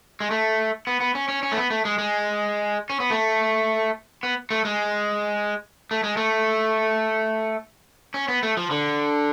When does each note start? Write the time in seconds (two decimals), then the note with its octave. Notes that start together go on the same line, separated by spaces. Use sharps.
0.20 G#3
0.31 A3
0.87 B3
1.00 B3
1.15 C#4
1.29 C#4
1.43 C#4
1.52 A3
1.57 B3
1.70 A3
1.85 G#3
1.98 G#3
2.90 C#4
3.00 B3
3.11 A3
4.23 B3
4.51 A3
4.65 G#3
5.91 A3
6.04 G#3
6.17 A3
8.14 C#4
8.28 B3
8.43 A3
8.57 F3
8.71 D3